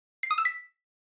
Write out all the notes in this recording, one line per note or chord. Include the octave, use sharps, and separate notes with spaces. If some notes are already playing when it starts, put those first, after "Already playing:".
C7
D#6
E6
B6